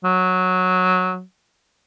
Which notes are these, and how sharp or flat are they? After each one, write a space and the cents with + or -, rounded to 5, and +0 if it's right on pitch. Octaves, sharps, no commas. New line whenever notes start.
F#3 -10